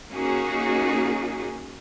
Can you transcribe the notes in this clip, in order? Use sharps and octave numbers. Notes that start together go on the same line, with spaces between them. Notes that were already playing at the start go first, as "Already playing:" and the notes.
A#3 C#4 D#4 F#4 G#4